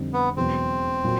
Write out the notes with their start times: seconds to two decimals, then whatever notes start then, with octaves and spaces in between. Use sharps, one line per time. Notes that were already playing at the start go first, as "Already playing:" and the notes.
Already playing: F2 D3 G3 C4 D#4
0.14 B3
0.37 E1 E2 B2 F#3 C4
1.04 A#2 F#3